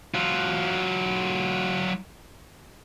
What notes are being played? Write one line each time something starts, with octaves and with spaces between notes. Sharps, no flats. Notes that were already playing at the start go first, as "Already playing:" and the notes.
F#3 F4